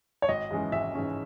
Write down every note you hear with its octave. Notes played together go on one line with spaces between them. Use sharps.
C#5
G#1 D#5
G#2 E3 G#3 C#4
G#1 E5
G#2 E3 G#3 C#4